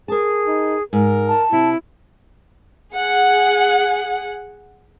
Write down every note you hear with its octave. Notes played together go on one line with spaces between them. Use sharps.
G#4 A#4 A5
D#4
G#2 A#4
A5
C3 E4
G#4 F#5